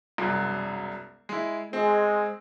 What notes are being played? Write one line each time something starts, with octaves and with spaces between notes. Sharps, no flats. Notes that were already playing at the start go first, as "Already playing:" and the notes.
E1 C2 F#2
G#3 E4
G#3 C4